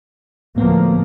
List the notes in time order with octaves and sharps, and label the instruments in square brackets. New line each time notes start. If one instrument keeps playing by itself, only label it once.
[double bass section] D2 F3 A#3 [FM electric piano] A2 B3